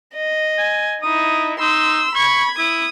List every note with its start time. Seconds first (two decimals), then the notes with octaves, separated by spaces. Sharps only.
0.15 D#5
0.58 G#5
1.02 D#4 E4 D#6
1.60 D#4 C6 E6
2.15 B5 C#6 G#6
2.58 E4 D#6